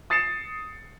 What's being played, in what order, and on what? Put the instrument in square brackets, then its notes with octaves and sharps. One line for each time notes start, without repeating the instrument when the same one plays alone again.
[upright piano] D#6 A6 C7 C#7 E7